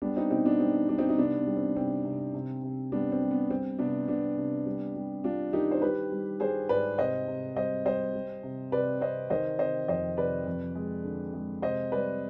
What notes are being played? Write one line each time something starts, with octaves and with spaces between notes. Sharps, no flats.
G3 B3 D4
C4 D#4
B2 C4 D#4
B3 D4
G3 C4
G3 D4
C4 D#4
D#4
C3 B3 D4
B3
G3
C4
C3 C4
C3
C3
C3
G3 B3 D4
C4
G3
B3
G3 C4
C3 B3 D4
C3 B3 D4
C3
G3
G3
G3 D4 F4
D#3 D#4 G4
C5
G3 G4 B4
G3
G3 G#4 C5
G#2 B4 D5
C3 C5 D#5
C3
G3 C5 D#5
G3 C5 D#5
G3
C3
C3 B4 D5
C3 C5 D#5
D#3 C5 D#5
C3 C5 D#5
F2 C5 D#5
C3 B4 D5
F2
G#3
D3
G#3
C3 C5 D#5
G3 B4 D5